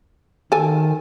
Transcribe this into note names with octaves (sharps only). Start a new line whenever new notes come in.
D#3 A4 G#5